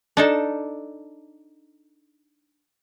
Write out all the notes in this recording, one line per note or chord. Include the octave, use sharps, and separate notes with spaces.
D4 D#4 A4